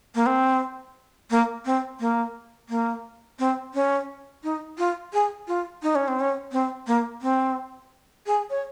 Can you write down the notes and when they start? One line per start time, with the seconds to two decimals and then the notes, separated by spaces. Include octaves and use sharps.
0.15 A#3
0.26 C4
1.31 A#3
1.65 C4
2.00 A#3
2.69 A#3
3.39 C4
3.74 C#4
4.43 D#4
4.78 F4
5.13 G#4
5.48 F4
5.82 D#4
5.95 C#4
6.08 C4
6.20 C#4
6.52 C4
6.87 A#3
7.22 C4
8.26 G#4
8.50 C#5